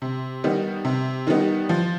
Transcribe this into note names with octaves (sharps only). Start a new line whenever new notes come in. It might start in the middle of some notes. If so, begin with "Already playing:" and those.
C3
D#3 G3 B3 D#4
C3
D#3 G3 B3 D#4
F3